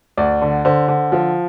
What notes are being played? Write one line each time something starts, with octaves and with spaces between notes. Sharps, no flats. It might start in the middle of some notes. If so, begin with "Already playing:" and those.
D2 D5
D3
D3 C5
D3
F3